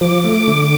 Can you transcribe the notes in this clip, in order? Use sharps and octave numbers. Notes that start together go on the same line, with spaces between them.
F3 D6
A3
D3